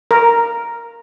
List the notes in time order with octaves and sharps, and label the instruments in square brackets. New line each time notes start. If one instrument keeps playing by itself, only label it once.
[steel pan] A#4